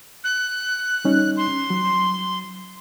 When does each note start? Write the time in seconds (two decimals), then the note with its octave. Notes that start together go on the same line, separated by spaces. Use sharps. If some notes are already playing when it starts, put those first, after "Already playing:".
0.24 F#6
1.05 G3 C#4 D#4
1.37 C6
1.70 F#3